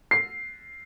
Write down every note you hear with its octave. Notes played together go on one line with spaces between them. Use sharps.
C7